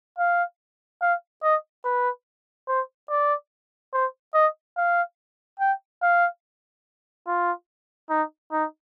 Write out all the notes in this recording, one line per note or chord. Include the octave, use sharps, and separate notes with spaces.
F5
F5
D#5
B4
C5
D5
C5
D#5
F5
G5
F5
F4
D#4
D#4